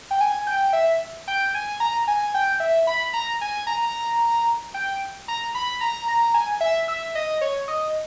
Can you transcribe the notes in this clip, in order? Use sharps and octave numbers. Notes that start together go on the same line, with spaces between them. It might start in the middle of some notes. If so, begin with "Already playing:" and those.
G5
G#5
G5
E5
G5
G#5
A#5
G#5
G5
E5
B5
A#5
G#5
A#5
G5
A#5
B5
A#5
A#5
G#5
E5
E5
D#5
C#5
D#5